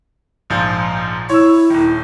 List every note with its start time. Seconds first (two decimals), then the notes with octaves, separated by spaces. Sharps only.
0.50 A#1 G#2 F3
1.29 E4 C#5 E6
1.70 D#1 D#3